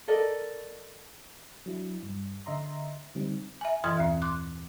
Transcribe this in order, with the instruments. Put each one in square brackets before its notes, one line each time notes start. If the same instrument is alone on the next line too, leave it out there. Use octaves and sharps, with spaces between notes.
[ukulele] A4 A#4 D5 D#5
[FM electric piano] F#3 D4 E4
G2
D3 D#5 E5 A#5 C6
D3 G3 C4 D#4
[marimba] E5 G#5
F#2 A#2 E3 C6 D#6 G#6
D#2 C4
C6 D6 F#6